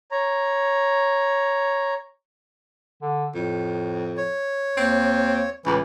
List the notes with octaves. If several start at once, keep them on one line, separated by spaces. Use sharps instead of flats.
C#5 A#5
D3
F2 A2
C#5
D#2 C4
C#2 A2 E3